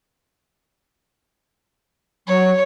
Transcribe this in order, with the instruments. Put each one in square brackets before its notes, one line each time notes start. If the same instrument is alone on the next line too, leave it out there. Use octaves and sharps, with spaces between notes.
[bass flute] F#3 [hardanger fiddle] C#5